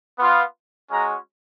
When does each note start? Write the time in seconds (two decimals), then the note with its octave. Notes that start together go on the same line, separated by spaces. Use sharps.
0.18 B3 F4
0.90 G#3 C#4 F#4 A#5